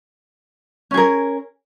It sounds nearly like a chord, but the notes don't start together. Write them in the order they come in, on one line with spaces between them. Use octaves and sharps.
C#4 G#4 A#4